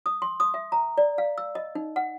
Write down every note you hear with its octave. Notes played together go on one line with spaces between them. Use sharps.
D#6
C6
D#6
E5
A#5
D5
F5
E6
D#5
D#4
F#5